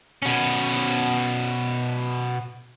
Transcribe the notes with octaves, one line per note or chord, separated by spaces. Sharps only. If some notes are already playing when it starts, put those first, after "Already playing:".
B2 C#4